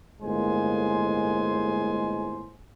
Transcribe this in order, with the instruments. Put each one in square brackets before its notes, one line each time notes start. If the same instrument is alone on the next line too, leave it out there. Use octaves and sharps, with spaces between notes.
[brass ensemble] G1 A2 G#3 A#3 C5 G#5